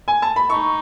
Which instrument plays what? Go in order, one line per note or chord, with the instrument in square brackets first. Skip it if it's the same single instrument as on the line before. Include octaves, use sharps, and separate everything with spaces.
[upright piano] G#5
A5
B5
[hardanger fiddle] D#4 [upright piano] C#6